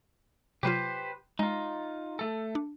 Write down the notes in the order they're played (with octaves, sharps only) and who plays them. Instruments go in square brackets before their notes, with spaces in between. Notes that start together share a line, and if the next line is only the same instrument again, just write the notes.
[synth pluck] C3 F#3 F4 [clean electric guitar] G4 B4 C5
[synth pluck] G#3 [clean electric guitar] D#4 F4
[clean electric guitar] A3 A4
[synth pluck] D4